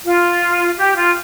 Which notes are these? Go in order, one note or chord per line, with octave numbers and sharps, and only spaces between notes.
F4
G4
F4